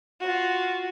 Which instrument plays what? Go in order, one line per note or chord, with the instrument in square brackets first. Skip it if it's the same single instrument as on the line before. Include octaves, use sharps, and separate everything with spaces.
[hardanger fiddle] F4 F#4